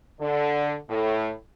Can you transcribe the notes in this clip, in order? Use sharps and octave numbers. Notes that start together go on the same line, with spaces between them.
D3
A2